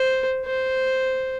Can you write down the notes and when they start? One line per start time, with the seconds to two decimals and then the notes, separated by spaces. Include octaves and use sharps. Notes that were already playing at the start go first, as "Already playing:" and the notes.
Already playing: C5
0.45 C5